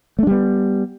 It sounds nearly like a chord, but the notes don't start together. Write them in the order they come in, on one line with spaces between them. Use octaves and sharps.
A3 D4 G3 B3